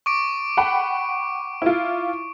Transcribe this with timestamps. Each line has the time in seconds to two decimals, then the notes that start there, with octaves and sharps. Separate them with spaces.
0.06 C#6 D6 D7
0.57 F#5 G5 B5
1.62 E4 F4